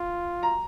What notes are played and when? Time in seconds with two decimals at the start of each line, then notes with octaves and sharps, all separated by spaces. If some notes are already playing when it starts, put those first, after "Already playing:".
Already playing: F4
0.43 A#5